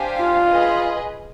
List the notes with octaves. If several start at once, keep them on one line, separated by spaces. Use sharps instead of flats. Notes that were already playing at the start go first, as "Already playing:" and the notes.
Already playing: D4 G4 C5 F5 G#5
F4
G#4 B4 D#5